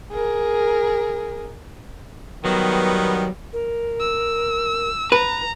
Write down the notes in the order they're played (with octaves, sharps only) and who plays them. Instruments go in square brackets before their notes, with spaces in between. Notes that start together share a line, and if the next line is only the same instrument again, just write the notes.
[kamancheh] G#4 A#4
[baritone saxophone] D#3 [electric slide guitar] F#3 [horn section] G3 B3
[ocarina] A#4
[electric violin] E6
[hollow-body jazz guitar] B4 [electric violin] A#5